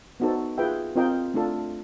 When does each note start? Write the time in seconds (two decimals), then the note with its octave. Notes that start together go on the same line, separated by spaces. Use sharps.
0.20 B3 D#4 F#4 A4 C5
0.58 F4 G#4 B4 E5 G5
0.95 C4 F4 A#4 D#5 G5
1.34 A3 D4 F4 A4